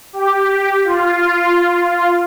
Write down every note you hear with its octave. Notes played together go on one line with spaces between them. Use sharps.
G4
F4